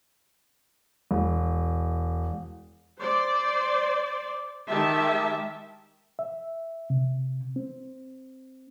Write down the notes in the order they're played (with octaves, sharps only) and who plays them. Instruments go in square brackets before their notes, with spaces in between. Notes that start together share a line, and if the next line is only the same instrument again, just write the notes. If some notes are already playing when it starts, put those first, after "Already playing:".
[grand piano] E1
[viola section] C5 D5
D#3 G#3 G4 E5 A5
[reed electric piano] E5
C3
C4